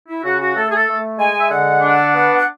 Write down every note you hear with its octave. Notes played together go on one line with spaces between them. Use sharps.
E4
C#3 F#4
F#4
A3 A4
G#4
A4
A3
G#3 G#5
E5
D3 F#5
D4
B3
F#5